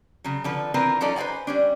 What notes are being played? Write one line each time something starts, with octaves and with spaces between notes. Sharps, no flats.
C#3 F#3
D3 F3 B4
E3 C4 D4 F4 A#4 B4
F#3 C#4 D#4 F4 A4 D5
B4 C5 D5 F#5 G#5
G3 C#4 D4